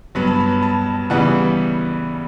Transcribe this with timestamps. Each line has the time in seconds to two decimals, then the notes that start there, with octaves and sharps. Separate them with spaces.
0.15 G2 F#3 B3 B5
0.27 A5
0.40 B5
0.62 A5
1.10 C#3 E3 G3 B3 F#5